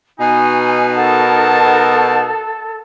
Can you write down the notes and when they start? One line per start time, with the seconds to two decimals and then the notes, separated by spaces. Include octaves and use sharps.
0.20 B2 D#4 G#5
0.96 A4 A#4 F#5 A5